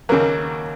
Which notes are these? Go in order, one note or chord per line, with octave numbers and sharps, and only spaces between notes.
D#2 C#3 F#3 A#3